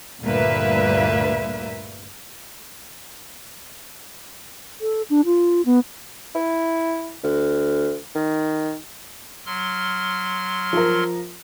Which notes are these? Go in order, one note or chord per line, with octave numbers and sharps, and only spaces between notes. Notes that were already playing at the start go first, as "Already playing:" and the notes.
D2 G2 A#2 A#3 B4 E5
A4
D4
F4
B3
E4
D2
D#3
F#3 C6 F6
F3 A#4